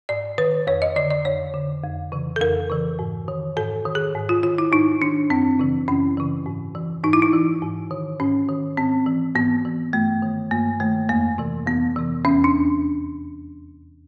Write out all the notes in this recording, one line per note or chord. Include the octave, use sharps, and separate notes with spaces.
G#2 D5
D#3 B4
F2 C#5
D#5
D3 D5
D5
F2 C#5
D3
F2
C#3 E3
A4
F2 A#4
C#3 E3
G#2
D#3
G#2 A4
D#3
G#4
G#2
F4
D#3 F4
E4
G#2 D#4
D#3 D4
F#2 C4
C#3 E3
F#2 C#4
C#3 E3
G#2
E3
G#2 D#4
E4
D#4
E3
G#2
D#3
G#2 C#4
D#3
G#2 C4
E3
G#2 B3
E3
G2 A3
D#3
G2 A#3
D#3 A3
F2 A#3
C3 E3
F2 B3
C3 E3
E2 C#4
D4